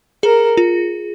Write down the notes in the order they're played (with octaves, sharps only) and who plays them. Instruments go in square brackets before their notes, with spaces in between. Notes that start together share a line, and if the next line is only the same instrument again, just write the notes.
[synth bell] G#4 [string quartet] A#4
[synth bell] F4